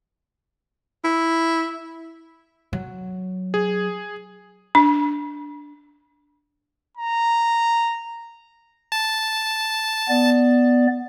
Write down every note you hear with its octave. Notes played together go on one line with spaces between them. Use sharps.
E4
F#3
G#4
D4
A#5
A5
B3 D5